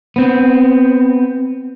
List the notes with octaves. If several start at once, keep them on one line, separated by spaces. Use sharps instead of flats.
B3 C4